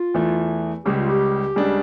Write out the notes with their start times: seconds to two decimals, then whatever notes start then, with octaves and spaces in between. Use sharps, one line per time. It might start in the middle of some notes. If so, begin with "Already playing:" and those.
Already playing: F4
0.14 E2 E3 A3
0.85 C#2 C#3 G3 G4
0.97 F4
1.09 G4
1.56 C#2 C#3 G3 D4